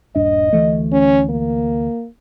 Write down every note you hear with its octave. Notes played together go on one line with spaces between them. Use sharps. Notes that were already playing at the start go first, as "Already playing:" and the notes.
D#1 G2 D4 D#5
D2 E3 A3
C#4
A#3